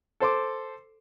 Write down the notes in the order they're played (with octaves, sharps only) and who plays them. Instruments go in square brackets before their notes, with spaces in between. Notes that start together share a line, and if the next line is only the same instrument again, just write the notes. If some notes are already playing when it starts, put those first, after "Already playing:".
[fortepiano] A4 C5 C6 D6